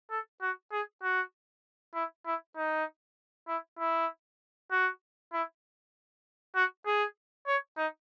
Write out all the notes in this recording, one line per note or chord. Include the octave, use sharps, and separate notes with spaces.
A4
F#4
G#4
F#4
E4
E4
D#4
E4
E4
F#4
E4
F#4
G#4
C#5
D#4